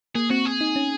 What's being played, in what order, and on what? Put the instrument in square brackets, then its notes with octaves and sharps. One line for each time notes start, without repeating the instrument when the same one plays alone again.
[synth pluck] A#3 [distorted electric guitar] G#4
[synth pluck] C4 [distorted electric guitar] F#4
[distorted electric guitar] G#4
[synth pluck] D#4
C#4